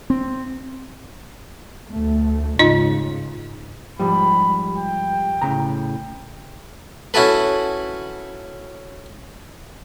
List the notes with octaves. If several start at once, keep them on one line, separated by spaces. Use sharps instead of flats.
C4
D2 A3
G#2 C#3 D#4 F4 D#5
G#2 F3 G3 B5
G5
A2 C#3 A#5
C#4 E4 F#4 A4 B4